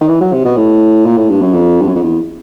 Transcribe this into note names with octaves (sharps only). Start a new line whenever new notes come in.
D#3
E3
F#3
C3
B2
A2
A#2
A2
G2
F#2
F2
G2
F#2
F2
E2